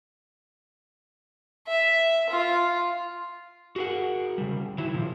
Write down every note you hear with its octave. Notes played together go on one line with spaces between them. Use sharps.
E5
F4
F#4 G#4 A#4 F#5
C#3 G3
D#3 F#3 E4
A#2 F3